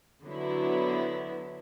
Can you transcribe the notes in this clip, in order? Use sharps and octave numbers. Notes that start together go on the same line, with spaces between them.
D3 F#3 B3 E4